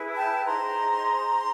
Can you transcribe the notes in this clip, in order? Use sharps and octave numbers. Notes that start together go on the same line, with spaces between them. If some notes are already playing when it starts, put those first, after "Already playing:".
Already playing: E4 G#4 B4
G5 A5
D#4 G#4 C5 A#5 C6